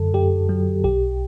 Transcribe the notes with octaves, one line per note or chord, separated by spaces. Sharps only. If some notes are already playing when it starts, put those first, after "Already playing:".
Already playing: F#2 D3 A4
F#2 G4
F#3
B1 G4